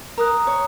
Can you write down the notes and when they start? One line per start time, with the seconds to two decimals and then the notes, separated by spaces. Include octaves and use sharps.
0.17 A#4 A#5 D#6 F#6
0.47 C#5